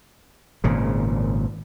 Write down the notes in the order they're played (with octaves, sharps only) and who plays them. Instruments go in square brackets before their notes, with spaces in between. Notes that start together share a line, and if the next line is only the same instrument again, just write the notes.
[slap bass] G#1 A#2 C#3